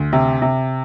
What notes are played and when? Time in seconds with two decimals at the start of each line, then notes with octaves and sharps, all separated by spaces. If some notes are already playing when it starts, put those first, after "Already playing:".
Already playing: D2
0.13 C3
0.42 C3